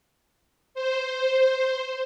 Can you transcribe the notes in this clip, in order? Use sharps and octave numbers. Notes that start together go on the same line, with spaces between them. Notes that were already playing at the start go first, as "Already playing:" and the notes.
C5